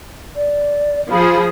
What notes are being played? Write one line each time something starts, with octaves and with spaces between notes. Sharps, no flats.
D5
F3 G#4 B5